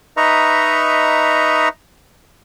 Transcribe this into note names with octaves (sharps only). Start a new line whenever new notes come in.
D#4 B4 D#5 E5 A#5 C#6